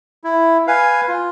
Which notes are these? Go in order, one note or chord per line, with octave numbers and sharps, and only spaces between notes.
E4
B4 F5 G#5
F4